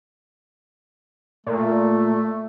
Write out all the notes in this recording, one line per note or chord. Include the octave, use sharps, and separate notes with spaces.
A#2 A3